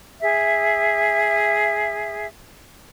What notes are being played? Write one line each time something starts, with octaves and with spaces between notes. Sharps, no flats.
G#4 E5